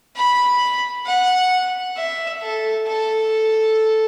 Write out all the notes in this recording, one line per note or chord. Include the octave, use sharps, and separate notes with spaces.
B5
F#5
E5
A4
A4